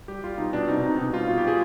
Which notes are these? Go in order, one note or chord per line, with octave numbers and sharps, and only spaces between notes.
G3 G4
G3 F4
B2 D#4
B2 D4
C3 D#4
C3 D#4
B2 D#4
G3 F4
B2 F4
G4
G3 G#4